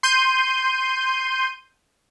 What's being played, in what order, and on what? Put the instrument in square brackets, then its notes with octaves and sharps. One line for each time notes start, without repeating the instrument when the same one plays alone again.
[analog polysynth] C6 G6 D#7